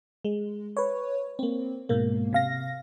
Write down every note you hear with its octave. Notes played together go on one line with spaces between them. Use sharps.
G#3
B4 C#5
A#3 C4
G#2 B2 A#3
C3 F5 A#6